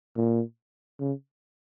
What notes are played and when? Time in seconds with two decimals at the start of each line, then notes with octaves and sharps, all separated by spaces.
0.16 A#2
1.00 C#3